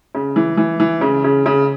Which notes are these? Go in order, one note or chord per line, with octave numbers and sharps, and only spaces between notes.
C#3
E3
E3
E3
C#3
C#3
C#3